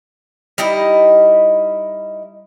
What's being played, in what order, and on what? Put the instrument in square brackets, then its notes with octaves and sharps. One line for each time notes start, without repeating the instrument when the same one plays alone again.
[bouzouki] G3 D#4 E4 D#5